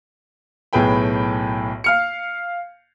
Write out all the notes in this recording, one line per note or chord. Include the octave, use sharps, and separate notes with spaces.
B1 A2 G#4 B4 G5 B5
F5 F6 C#7